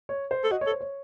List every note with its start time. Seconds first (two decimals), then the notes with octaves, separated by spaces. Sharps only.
0.09 C#5
0.31 C5
0.43 A4
0.51 F#4 D#5
0.61 C#5
0.66 A4
0.71 C5
0.81 C#5